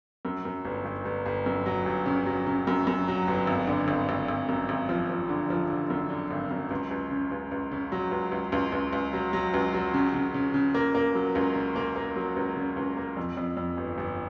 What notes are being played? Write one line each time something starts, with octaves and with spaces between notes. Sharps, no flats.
F#2
F#2
G1
G1
G1
G1
F#2
F#3
G1
C#3
F#3
C#3
F#2
F#2
F#3
G1
G#1
D3
G#1
G#1
G#1
F#2
G#1
F3
F3
D3
F3
D3
F#2
D3
G#1
F#2
C#2
C#2
C#3
C#2
C#2
C#3
F#3
C#2
C#2
C#2
C#2
C#2
F#3
F#3
C#2
F#3
C#3
C#3
C#3
C#3
A#3
A#3
F#3
C#2
C#3
A#3
A#3
F#3
C#2
C#3
C#2
A#3
F2
F2
F2
G1
G1